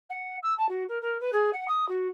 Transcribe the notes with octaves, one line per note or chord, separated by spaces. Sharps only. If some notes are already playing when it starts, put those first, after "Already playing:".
F#5
E6
A5
F#4
A#4
A#4
B4
G#4
F#5
D#6
F#4